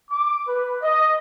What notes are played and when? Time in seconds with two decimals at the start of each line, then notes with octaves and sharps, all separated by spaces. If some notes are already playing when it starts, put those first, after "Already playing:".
0.10 D6
0.47 B4
0.82 D#5